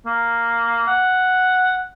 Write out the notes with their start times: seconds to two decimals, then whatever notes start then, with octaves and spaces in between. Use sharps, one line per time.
0.06 A#3
0.87 F#5